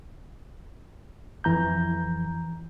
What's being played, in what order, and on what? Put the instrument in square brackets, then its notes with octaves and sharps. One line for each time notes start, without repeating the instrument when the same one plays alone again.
[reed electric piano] F2 E3 A#5 G6